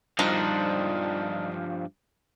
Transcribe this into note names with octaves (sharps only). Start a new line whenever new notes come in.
G2 F3 D4 D#4 C5